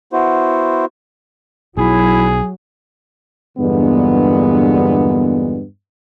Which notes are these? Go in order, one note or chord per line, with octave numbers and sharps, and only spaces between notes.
B3 E4 F#4 C5
B1 F#3 E4 G#4
E2 G2 A#2 D3 G#3 B3